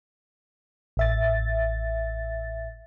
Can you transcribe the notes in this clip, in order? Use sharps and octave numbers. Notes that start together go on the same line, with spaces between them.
A1 E5 A6